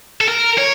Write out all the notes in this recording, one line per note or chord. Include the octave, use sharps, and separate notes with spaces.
A4
A#4
C#5